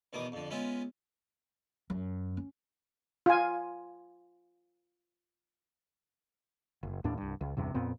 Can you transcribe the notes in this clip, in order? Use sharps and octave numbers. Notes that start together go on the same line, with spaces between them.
E2 B2 D#3 D6 D#6
F2 D3
G#3 B3 C#4 F4 E5
F#2
C#4
F4 G#5
F#1
D#2 A2 D4
C2 G2
C#2
A1 E2 G2 C3
F2 A#2 B3 C4